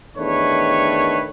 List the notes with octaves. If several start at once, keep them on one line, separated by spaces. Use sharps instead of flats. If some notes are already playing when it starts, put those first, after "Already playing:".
E2 D#3 A3 D4 B4 C#5